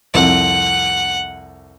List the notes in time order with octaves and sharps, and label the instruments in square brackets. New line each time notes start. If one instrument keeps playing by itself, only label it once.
[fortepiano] C2 F2 [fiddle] F#5